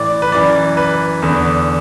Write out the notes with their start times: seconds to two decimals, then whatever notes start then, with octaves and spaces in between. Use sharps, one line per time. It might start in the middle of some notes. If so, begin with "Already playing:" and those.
Already playing: A2 E3 D5
0.22 B4
0.32 F#2 E3 D5
0.77 B4
1.22 E2 D3